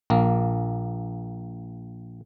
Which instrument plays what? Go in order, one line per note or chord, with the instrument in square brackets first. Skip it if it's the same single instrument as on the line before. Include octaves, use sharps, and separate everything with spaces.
[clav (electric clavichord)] A#1 A#3